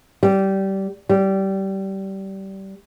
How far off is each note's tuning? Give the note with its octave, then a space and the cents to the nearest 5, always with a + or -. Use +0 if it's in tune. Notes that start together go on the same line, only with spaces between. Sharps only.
G3 -20
G3 -20